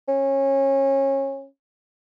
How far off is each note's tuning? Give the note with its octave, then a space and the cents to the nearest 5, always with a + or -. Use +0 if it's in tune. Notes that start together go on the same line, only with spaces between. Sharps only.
C#4 -25